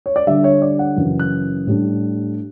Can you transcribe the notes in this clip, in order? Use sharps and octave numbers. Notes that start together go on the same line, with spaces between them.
C#5
D5
D3 G3 D4 E5
C#5
D5
F#5
F#2 C#3 E3
F#6
A2 G3 D4